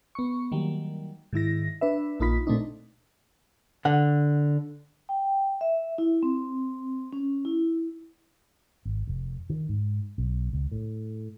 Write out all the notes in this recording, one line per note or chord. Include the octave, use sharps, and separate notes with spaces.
B3 C#6
D#3 F#3 G3 A#3
G#2 D#3 E4 A#6
D4 B4 E5
A#1 A#3 D#4 F4 B5 B6
A#2 A3 C4 D4 D#4
D3 F#5
G5
E5
E4
C4
C#4
E4
G#1
F1
D#3
G#2
B1
C#2
A2